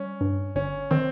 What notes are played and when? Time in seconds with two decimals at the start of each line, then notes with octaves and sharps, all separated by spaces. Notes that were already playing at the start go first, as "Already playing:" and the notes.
Already playing: G3 C#4
0.21 G2
0.55 G1 C#4
0.91 D#3 C4